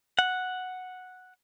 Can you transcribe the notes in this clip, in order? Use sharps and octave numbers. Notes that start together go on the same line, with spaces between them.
F#5